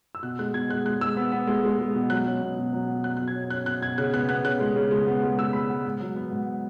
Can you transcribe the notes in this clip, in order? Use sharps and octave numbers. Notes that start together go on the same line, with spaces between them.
E6
B2 F#6
G#3 F#6
B2 G#6
G#3 F#6
G#3 F#6
G#3 E6
B3
B3
G#3
G#3
G#3
B2
F#3 F#6
C#4
B2
B2
F#3
B2
F#3 F#6
B2 F#6
G#6
C#4
C#4 F#6
B2 F#6
B2 G#6
C#3 F#6
B3 F#6
B3 F#6
C#3 F#6
G#3
C#3
G#3
B3
G#3
G#3 E6
G#3 B5
G#3 F#5
G#2
F#3
B3
G#2